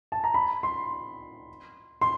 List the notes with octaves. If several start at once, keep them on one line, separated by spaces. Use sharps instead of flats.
A5
A#5
B5
C6
C6